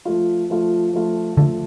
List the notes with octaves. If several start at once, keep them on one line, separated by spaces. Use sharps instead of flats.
F3 A3 F4
F3 A3 F4
F3 A3 F4
D3 F3 A3 F4